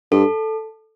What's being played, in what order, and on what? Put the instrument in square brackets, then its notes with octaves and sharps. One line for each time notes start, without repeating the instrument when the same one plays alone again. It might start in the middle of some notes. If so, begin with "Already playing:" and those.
[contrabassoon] G2 [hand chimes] A4